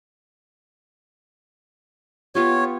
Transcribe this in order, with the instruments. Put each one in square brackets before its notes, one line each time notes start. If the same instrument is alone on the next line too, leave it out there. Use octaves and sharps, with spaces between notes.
[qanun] B3 F4 G4 [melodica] C#5